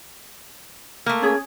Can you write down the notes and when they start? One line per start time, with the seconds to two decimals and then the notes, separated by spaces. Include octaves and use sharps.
1.06 A3 A#3
1.22 C#4 G#4